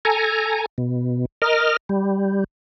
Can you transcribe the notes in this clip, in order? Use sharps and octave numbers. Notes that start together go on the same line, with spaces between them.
A4 G#5 A#5
B2
A#4 D#5 F6
G3